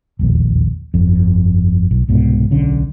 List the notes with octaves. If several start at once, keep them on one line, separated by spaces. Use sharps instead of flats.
E1 A#1 D#2
G1 F2
B1
C2 G#2 B2
D1 B1 D3 C#4